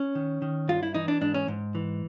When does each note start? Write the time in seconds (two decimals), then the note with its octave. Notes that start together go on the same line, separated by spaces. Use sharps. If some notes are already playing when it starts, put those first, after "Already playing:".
Already playing: C#4
0.15 D#3
0.42 D#3
0.68 G2 F4
0.83 E4
0.95 E3 D#4
1.08 D4
1.21 G#2 D4
1.34 C#4
1.48 G#2
1.75 E3